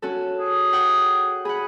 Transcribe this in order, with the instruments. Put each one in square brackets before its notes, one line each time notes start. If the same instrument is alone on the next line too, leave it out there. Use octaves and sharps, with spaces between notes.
[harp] C#4 F#4 A4
[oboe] G#4
[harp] F#5 G5
[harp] G#4 F#5 [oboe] B5